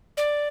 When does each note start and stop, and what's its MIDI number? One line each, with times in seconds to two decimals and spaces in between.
0.17 0.48 74